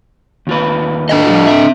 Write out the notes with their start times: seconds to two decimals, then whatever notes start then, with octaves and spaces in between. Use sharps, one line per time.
0.47 D#2 F4 B4
1.09 D4 A4 D#5
1.26 F3 G3 F4
1.47 C4 E5